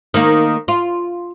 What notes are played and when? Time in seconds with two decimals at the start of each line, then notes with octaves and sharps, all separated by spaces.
0.14 D#3 A#3
0.68 F4